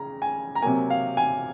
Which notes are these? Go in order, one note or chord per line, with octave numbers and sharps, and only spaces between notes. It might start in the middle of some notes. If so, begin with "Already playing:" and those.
Already playing: C#3 A#5
G#5
A#5
C3 F#3 A#3 G#5
F5
G#5